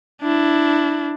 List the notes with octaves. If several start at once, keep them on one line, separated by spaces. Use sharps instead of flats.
D4 E4